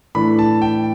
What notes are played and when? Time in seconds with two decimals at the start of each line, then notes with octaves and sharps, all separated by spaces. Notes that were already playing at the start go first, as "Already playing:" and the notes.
0.15 A2 E3 A3 D4 B5
0.39 A5
0.62 G5